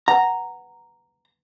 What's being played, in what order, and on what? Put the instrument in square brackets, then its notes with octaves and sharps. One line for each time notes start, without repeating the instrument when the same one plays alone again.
[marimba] B4 F#5 [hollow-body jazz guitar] A#5